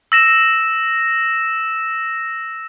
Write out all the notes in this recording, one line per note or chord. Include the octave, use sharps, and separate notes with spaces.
E6 A#6 E7